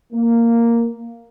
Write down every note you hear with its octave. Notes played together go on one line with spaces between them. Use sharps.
A#3